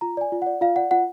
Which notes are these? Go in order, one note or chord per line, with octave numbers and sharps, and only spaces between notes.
F4 A#5
D5 G#5
F4
D5 F#5
F4 F5
D5 F#5
F4 F#5